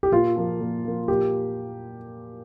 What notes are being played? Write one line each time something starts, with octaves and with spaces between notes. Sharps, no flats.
G4
A#2 F4
F3 A#3
A#2
F3 A#3
A#2 G4